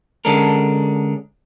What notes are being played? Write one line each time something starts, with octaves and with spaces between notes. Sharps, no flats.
D3 G#3 C#4 D4 A4 A#4